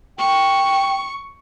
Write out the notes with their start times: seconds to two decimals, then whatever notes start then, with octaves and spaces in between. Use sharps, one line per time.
0.19 G5 C#6